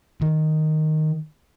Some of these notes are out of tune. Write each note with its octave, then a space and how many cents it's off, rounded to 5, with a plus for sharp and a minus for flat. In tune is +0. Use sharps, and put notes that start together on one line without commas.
D#3 -5